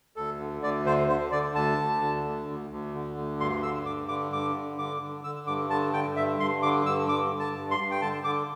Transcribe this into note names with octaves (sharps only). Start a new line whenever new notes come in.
D2 A4
D3
D2 D5
D3 C5
D3 C5
D3 D5
D2 A5
D2
D3
D2
D2
D2
D3
D2
G2 C6
D3 E6
G2 D6
D3 D6
G2 D6
D3
D3 D6
D3
D3 E6
G2 D6
D3 A5
D3 G5
G2 E5
G2 C6
D3 D6
G2 E6
G2 D6
D3
A5
G2
C6
G2
G5
D3 A5
D3 D6